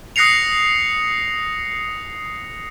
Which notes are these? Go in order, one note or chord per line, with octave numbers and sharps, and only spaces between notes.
D#6 F#6 A#6 C7 C#7 F7